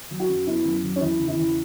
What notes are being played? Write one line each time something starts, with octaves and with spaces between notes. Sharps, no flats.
F#3
F#4
F#2
B3 E4
F#2
F#3
C#4
E2 E4
C#3
E4
E2